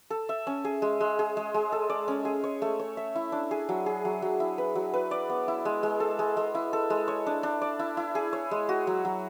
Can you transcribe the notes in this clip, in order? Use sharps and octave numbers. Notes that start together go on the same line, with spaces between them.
A4
E5
C#4
G#4
G#3
G#3
G#4
G#3
G#3
A4
D5
C#4
G#4
C#5
A3
C#5
E5
E4
D4
G#4
F#3
G#4
F#3
F#3
E4
B4
F#3
B4
D5
B3
E4
G#3
G#3
A4
G#3
G#3
E4
A4
G#3
C#5
D4
D4
D5
E4
E4
G#4
C#5
G#3
F#4
F#3
F#3